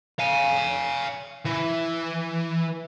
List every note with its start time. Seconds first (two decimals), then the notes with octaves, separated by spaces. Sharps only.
0.19 F5 G#5
1.45 E3